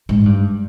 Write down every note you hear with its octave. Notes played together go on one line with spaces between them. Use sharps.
G#2
G2